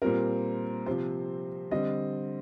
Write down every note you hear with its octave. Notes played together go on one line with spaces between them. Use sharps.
A#2 G3 C4 A#4
C3 F3 C4 C5
D3 G3 C4 D#5